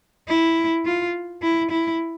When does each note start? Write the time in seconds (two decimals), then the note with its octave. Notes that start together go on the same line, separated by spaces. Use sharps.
0.28 E4
0.85 F4
1.42 E4
1.71 E4